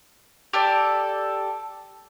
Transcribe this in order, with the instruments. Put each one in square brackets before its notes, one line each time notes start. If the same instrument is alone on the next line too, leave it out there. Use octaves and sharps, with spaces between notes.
[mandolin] G4 A4 D5